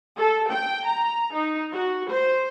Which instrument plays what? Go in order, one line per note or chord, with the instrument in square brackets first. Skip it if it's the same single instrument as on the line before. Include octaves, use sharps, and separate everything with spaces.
[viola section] A4
G5
A#5
D#4
F#4
C5